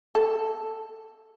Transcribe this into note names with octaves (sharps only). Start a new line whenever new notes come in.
A4